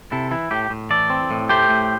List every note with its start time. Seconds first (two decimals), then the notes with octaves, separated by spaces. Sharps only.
0.12 C3 E4 A4
0.31 E3 E4
0.51 A2 G4
0.70 A2
0.90 E3 A4 D5
1.10 C4
1.31 A2
1.49 A3 G4 C5
1.70 A2